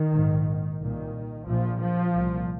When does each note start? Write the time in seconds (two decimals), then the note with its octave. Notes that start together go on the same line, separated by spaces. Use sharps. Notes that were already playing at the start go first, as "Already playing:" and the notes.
Already playing: D#3
0.12 A#1 G#2
0.79 C2 A#2 D#3
1.46 A#1 A#2 F3
1.80 F3
2.13 C2 A#2